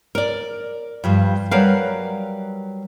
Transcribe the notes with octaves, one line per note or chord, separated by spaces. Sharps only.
A#4 D5
G2 F3 G3
F#3 G3 A#4 B4 F5